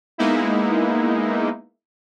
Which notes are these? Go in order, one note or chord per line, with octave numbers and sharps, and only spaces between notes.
G#3 A#3 B3 D#4 E4